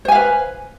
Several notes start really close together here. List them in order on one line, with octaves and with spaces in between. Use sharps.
C5 G#5 F5 B4